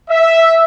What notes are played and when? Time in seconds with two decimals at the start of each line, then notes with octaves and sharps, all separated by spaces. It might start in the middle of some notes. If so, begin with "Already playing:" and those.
0.10 E5